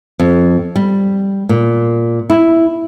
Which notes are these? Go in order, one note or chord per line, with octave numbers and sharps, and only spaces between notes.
F2
G3
A#2
E4